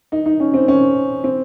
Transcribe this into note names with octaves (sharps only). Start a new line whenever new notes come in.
D#4
D#4
C#4
C4
C#4
C4